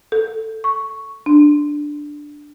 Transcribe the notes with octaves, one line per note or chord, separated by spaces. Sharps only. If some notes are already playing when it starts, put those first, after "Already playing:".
A4
C#6
D4